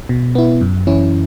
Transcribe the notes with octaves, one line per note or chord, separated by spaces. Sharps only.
B2
B3 E4
F#2
E3 C#4 E4